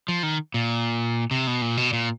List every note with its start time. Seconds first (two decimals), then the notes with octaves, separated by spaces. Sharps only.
0.08 F3
0.23 D#3
0.54 A#2
1.31 C3
1.47 B2
1.62 A#2
1.77 B2
1.93 A#2